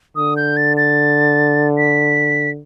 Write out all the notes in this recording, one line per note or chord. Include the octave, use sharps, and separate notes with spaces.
D3 D#6
G6
A6
A6
B6